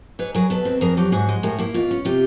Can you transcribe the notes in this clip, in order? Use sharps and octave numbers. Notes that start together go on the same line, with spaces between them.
G#2 B4 C#5
F#3 G#4 A#4
B2 A4 B4
C4
F2 G#4 A#4
F#3 G4 A4
G#2 F#4 G#4
G#3
A2 G#4 A#4
A#3 E4
B2 F4
C#4
C3 F4 G4